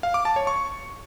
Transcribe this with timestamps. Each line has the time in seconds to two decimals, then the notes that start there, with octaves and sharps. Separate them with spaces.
0.03 F5
0.14 D6
0.25 A5
0.36 C#5
0.47 C#6